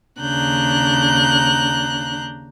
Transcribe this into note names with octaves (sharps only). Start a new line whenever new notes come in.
D#2 C#3 D4 A#5 F#6 G6